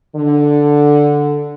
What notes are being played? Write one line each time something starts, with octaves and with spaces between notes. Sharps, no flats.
D3